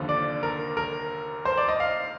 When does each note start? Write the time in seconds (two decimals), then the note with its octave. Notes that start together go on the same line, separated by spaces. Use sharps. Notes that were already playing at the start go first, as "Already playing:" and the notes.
Already playing: F1 D#2 D3 F3
0.09 D5
0.43 A#4
0.77 A#4
1.45 C5
1.57 D5
1.68 D#5
1.80 F5